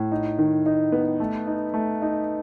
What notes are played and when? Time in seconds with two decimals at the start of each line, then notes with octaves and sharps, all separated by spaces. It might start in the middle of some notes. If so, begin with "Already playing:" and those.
Already playing: A2
0.12 D#4
0.39 D#3
0.66 D#4
0.92 B3
1.20 A3
1.47 D#4
1.74 A3
2.02 D#4